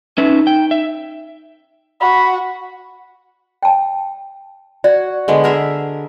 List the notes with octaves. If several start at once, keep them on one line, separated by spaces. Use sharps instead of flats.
C#4 D#4 B4 E5
G5
E5
F#4 B5
G5 A5
F#4 D5
D3 G#3 B3
G#4 A#4 E5